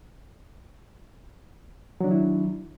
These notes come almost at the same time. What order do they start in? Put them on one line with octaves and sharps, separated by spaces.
F#3 D4 D#3 E4